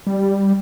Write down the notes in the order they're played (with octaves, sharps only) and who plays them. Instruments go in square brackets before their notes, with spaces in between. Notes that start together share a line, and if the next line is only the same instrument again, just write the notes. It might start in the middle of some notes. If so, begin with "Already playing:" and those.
[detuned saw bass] G3